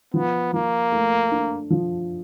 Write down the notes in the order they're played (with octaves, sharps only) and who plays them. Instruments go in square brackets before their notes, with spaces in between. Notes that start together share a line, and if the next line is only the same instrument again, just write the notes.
[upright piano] F3 [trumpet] B3
[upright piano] F3 [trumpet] A#3
[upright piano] A3
D4
F3